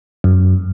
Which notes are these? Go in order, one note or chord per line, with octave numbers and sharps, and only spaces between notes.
F#2